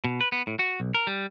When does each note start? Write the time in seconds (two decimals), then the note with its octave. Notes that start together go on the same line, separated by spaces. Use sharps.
0.04 B2
0.21 B4
0.32 B3
0.47 A2
0.59 F#4
0.80 B1
0.94 A#4
1.07 G3